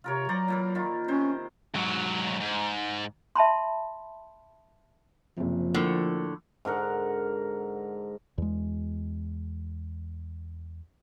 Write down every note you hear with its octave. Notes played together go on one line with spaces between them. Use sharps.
C3 F4 A#4 C#5
F#3 C5 D5 A#5
A#2 E3 A#4
D#3 F4
C3 C#4 C5
G#2 F#3
G#2
E5 A5 B5 C6
F#1 C3 F3
A2 D3 A#3
G#2 D3 A#4 F#5
E2 G#3